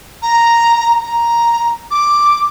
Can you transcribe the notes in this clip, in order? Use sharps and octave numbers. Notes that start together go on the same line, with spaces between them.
A#5
A#5
D6